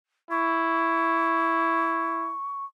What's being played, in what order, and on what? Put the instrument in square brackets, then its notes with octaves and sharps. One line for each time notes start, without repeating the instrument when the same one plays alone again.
[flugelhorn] E4 [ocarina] C#6